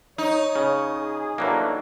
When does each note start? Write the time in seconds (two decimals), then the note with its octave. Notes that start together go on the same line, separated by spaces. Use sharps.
0.18 D#4 C#5
0.56 C#3
0.95 G#4
1.38 C#3 E3 F#3 A3 A#3 D4